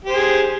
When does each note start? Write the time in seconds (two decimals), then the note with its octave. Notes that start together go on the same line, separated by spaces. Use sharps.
0.05 G4
0.09 C5
0.14 G#4